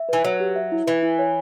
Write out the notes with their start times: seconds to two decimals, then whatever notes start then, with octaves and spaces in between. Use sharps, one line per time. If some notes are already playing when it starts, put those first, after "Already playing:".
Already playing: E5
0.09 E3 B4
0.24 F#3 C#5
0.40 G4
0.56 E5
0.72 E4
0.87 E3 B4
1.02 E4
1.19 C#5